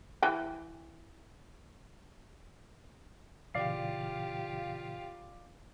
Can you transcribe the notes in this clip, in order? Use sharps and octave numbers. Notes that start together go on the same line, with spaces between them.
E3 G5
A#2 C#3 E3 F4 G4 D5 F5 C7